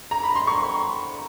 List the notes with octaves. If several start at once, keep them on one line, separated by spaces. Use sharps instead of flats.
A#5
B5
C6
C#6